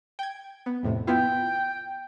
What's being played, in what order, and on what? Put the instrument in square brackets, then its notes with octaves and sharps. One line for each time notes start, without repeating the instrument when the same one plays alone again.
[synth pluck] G5 G#6
B3
F2 A2 C3
[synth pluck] B3 E4 F4 [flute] G5